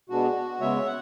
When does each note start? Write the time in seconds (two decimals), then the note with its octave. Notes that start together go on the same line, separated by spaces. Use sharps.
0.09 B2 G#3 B3 D4 F#4
0.60 C#3 G#3 B3 C#5 E5
0.86 F#5